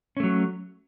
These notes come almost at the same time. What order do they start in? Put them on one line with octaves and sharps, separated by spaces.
C#4 A3 F#3